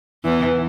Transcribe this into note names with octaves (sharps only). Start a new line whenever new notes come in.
E2 E3